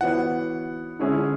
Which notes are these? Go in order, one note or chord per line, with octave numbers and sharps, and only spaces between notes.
E3 B3 F#4 C#5 F#5
D3 G#3 C#4 E4 G#4